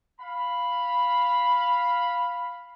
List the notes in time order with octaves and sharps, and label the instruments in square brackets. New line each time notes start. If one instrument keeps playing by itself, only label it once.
[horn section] F5 B5